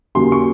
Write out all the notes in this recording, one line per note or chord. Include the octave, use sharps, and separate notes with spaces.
D#2 C#3 F#3 C6
C#6